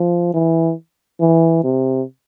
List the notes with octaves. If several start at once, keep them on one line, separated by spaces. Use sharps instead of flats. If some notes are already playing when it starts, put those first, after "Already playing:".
Already playing: F3
E3
E3
C3